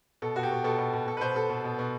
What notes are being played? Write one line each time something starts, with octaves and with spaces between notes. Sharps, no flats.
B2 A4
B2 F#4
G4
B2
B2 A4
B2
B2
B2 A4
B4
B2 C5
B2 A4
B2
B2
B2